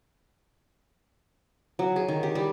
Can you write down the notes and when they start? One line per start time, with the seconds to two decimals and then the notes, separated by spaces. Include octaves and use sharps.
1.79 F#3
1.96 G#4
2.08 D#3
2.23 G4
2.35 G3